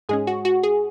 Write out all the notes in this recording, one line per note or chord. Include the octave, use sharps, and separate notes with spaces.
G#2 G#3 C#4 G#4
F#4
F#4
G#4